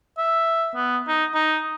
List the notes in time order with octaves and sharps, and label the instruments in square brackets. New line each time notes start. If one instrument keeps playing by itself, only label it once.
[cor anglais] E5
B3
D#4
D#4